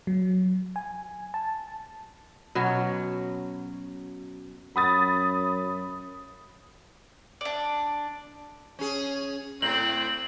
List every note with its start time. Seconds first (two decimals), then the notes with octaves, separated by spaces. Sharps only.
0.07 F#3
0.76 G#5
1.34 A5
2.55 B2 F#3 C#4
4.76 F#2 B5 D#6 A6
7.41 D4 D5
8.79 C#4 G#4
9.62 A2 C4 F#7